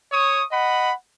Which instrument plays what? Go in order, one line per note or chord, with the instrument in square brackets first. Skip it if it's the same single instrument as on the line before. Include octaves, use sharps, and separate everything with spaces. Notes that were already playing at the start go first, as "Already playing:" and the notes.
[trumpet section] C#5 C#6 D#6
D#5 F#5 B5